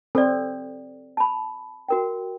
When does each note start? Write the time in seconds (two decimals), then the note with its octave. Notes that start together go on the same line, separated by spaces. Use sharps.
0.15 C4 A4 D5
1.17 A5 B5
1.88 F#4 A#4 G5